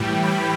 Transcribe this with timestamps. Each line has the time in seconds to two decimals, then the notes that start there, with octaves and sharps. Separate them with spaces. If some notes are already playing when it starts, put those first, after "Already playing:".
Already playing: A2 E3 G3 G5
0.23 B5